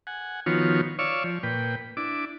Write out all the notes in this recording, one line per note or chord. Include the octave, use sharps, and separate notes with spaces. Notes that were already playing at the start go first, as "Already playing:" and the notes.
F#5 G#5
D#3 F3 B3 F4 F#4 C#5
C#5 D5 F5 C#6 E6
F3
A#2 B4 G5
D4 E4 D6